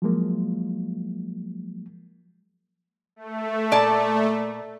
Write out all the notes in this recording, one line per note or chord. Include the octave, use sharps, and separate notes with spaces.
F3 F#3 G#3 A#3
A3
A#2 D5 A5